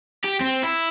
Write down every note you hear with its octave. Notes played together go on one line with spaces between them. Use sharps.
G4
C4
E4